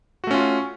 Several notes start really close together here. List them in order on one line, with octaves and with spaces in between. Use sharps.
F#4 A3 C#4 F4